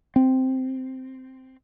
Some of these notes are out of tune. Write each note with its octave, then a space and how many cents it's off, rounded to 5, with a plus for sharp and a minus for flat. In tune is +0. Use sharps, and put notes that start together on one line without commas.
C4 -5